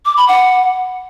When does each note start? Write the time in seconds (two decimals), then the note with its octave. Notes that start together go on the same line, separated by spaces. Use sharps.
0.06 D6
0.17 B5
0.28 F#5